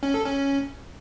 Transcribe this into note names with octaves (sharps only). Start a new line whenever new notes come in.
C#4
A4
C#4